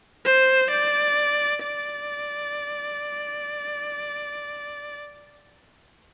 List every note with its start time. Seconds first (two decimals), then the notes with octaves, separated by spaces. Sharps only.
0.25 C5
0.71 D5
1.63 D5